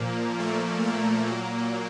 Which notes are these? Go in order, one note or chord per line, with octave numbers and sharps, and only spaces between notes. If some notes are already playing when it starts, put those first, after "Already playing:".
Already playing: A#2 F3 A#3
A3
A#3
A#2 F#3